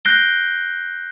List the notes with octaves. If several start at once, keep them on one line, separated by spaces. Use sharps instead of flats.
F#6 G6 A#6 C7 D7 G7